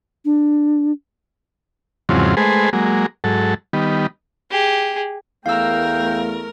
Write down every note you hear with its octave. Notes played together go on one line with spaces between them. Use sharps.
D4
E2 G#2 C#3 F3 F#3 C4
G#3 A3 G#4 B4 C5
F#3 G#3 A#3
G#2 F#3 A4
D#3 G3 B3
G4 G#4
E2 A3 A#4 F5 G5 E6